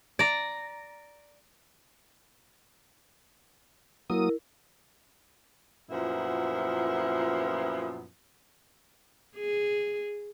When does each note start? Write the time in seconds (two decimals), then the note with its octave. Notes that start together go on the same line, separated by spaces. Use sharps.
0.19 D5 A#5
4.10 F#3 A#3 E4 A#4 D#6
5.90 F#2 A#2 F3 B3 E4
9.36 G#4